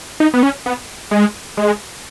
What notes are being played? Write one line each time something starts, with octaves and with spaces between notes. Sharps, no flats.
D#4
B3
C#4
B3
G#3
G#3